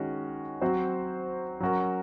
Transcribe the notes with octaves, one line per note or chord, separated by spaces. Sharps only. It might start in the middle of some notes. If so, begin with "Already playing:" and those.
Already playing: D#3 G#3 C#4 F#4
F#3 C4 F#4 C5
F#3 C#4 F#4 A#4